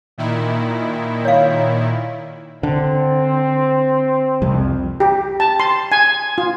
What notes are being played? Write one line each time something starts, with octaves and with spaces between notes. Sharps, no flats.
A#2 D#3 E4
C#5 F5
D3 C4
C2 F2
G4
A5
C6
G#5
F4